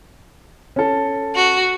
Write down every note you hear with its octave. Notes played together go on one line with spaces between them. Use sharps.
C#4 A4
F#4